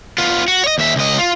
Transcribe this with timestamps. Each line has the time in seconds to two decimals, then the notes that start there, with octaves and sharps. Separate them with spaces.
0.18 B3 F4
0.48 F#4
0.64 C#5 D#5
0.78 D#2 E5
0.96 C#2 D#5
1.18 F4